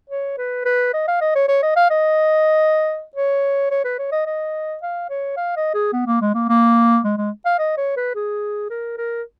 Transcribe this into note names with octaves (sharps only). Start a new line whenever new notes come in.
C#5
B4
B4
D#5
F5
D#5
C#5
C#5
D#5
F5
D#5
C#5
C#5
B4
C#5
D#5
D#5
F5
C#5
F5
D#5
G#4
B3
A#3
G#3
A#3
A#3
G#3
G#3
F5
D#5
C#5
B4
G#4
A#4
A#4